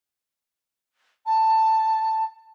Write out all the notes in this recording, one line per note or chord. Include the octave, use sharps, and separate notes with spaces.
A5